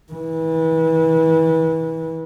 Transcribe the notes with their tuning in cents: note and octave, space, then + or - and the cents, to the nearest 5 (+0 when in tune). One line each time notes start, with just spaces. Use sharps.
E3 -30